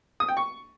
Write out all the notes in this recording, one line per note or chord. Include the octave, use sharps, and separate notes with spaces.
D#6
G5
C#6